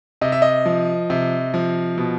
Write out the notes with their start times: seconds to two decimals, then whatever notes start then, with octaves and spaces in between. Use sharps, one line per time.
0.21 C3 D#5
0.32 E5
0.42 D#5
0.66 F3
1.10 C3
1.54 F3
1.98 B2